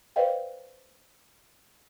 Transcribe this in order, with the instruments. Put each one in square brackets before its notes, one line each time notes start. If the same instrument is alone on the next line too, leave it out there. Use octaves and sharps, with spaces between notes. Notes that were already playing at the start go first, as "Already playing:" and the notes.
[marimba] B4 C5 D5 D#5 F5 G5